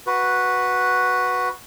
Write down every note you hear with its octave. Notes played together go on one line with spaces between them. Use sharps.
F#4 B4